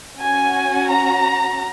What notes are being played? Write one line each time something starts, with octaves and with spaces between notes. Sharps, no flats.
C#4 F#4 G#5
A#5